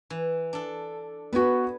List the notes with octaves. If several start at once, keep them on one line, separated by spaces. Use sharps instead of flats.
E3
D4 A4
B3 F#4 B4 G#5